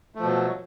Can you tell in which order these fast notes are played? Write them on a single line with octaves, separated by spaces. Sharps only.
A3 F3 B2 F#3